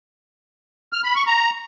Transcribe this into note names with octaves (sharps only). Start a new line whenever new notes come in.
F6
B5
C#6
A#5